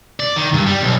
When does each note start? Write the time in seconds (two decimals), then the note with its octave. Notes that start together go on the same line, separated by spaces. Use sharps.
0.20 D5
0.36 D#3
0.54 G2
0.67 G3
0.81 B1